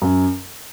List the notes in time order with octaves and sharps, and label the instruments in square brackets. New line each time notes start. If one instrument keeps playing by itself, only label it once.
[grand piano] F#2